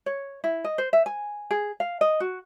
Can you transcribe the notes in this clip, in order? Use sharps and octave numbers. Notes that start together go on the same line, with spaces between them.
C#5
E4
D#5
C5
E5
G#5
G#4
F5
D#5
F#4